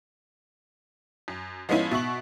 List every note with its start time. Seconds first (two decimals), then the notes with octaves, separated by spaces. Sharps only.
1.28 F#2
1.69 F3 G#3 B3 C#4 E4
1.91 B2 E5 C#6 F#7